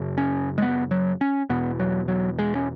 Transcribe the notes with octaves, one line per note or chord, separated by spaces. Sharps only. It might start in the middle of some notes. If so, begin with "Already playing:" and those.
Already playing: F#2 C#3
C#4
G#3
B3
F#3
C#4
E2 B2 B3
F#3
F#3
G#3
C#4